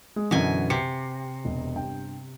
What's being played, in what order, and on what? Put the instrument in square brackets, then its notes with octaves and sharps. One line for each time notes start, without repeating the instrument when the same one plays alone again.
[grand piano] G#3
[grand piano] F#2 D3 E3 [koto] B2 G#5
[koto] C3 [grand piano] C7 C#7
[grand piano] E1
G2 G5